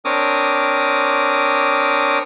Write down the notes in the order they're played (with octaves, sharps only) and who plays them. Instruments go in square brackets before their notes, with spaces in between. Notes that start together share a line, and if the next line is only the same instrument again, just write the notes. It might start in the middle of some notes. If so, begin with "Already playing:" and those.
[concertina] C4 D4 A#4 C#5 D6 D#6